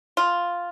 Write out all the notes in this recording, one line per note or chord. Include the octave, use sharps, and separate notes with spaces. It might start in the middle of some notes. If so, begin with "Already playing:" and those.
F4